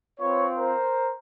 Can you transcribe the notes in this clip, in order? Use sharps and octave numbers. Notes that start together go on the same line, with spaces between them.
C4 F4 B4 C#5
A#4 C5